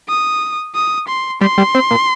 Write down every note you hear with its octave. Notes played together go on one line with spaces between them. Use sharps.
D#6
D#6
C6
G3 C6
G3
C4
A#2